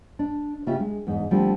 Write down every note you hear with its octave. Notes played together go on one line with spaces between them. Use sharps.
D4
C#3 A#3 C#4 F4 G4 E5
G#3
E2 G#2
D3 F3 G3 A3 A#3 C4